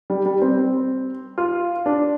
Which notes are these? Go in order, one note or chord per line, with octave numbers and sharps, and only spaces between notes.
G3
G3
C4
F4
D4